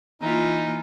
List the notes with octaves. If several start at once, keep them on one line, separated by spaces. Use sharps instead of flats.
E3 A#3 D#4 F4